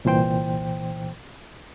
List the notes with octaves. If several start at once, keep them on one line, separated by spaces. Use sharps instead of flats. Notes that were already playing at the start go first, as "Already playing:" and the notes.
C2 A#2 E3 C5 G5